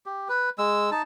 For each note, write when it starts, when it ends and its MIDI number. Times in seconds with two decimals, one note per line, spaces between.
0.06 0.28 67
0.29 0.50 71
0.58 0.90 56
0.58 0.90 88
0.92 1.02 63
0.92 1.02 81